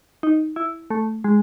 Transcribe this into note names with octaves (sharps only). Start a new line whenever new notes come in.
D#4
E4
A3
G#3